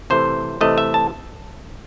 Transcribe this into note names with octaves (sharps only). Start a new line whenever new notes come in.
C3 E3 A3 C5
C3 E3 A3 D#5
E5
A5